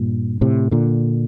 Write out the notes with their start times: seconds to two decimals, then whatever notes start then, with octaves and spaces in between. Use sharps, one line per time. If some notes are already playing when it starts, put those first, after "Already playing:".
Already playing: G2 A#2
0.41 A2 C3
0.71 A#2 D3